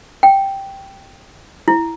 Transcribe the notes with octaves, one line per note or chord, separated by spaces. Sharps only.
G5
E4